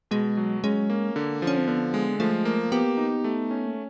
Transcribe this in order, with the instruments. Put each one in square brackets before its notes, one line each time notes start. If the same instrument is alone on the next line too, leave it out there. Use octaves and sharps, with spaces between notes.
[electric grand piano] B2 [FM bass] G#3
[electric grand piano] F#3
[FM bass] G#3 [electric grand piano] C#4
[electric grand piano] A#3
D3
F3
[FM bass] C#4
C4
[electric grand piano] D3 [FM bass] B3
[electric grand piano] G#3
[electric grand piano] F3 [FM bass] A3
[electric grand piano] A#3
[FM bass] B3 [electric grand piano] G4
[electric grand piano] D#4
A3
C#4
[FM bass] A#3